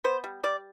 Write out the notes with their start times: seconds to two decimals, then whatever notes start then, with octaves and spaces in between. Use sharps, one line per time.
0.04 B3 C5
0.24 G3
0.43 G3 D5